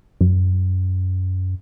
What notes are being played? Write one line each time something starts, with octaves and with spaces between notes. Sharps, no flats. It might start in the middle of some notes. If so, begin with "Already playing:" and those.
F#2